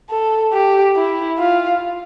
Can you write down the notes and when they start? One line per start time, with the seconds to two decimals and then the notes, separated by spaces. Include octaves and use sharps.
0.10 A4
0.53 G4
0.96 E4
1.38 F4